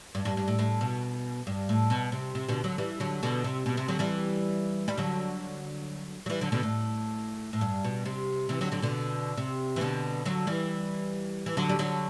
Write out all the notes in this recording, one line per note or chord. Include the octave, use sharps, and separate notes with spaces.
G2
G2
G2
A2
A2
B2
G2
A2
B2
C3
C3
B2 D3
D3 F#3
E3 G3
D3 F#3
B2 D3
C3
B2
C3
D3 F#3
E3 G3
G3
D3 F#3
F#3
E3 G3
D3 F#3
B2 D3
A2
A2
G2
B2
C3
C3 E3
D3 F#3
D3 F#3
B2 D3
C3
E3
B2 D3
D3 F#3
E3 G3
E3
D3 F#3
G3
D3 F#3